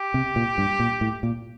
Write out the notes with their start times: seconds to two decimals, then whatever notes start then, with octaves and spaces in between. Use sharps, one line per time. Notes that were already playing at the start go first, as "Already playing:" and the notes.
Already playing: G4
0.14 C3
0.36 A#2
0.58 G2
0.80 A#2
1.01 A2
1.23 A#2